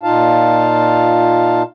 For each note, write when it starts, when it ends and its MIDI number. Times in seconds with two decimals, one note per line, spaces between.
0.03 1.63 46
0.03 1.63 63
0.03 1.63 65
0.03 1.63 77
0.03 1.63 81